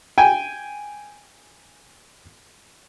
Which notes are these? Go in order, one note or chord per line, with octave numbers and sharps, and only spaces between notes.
G5 G#5